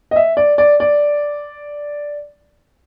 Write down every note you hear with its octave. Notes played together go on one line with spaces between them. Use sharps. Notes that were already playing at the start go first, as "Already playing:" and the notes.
D#5
E5
D5
D5
D5